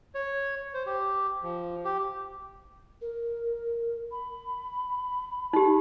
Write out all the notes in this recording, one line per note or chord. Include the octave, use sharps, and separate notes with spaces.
C#5
C5
G4
F3
G4
A#4
B5
D#4 G4